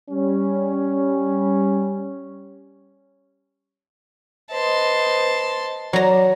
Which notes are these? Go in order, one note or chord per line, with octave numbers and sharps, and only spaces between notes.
G3 C#4
B4 C5 D#5 A5 C6
F#3 D5 A#5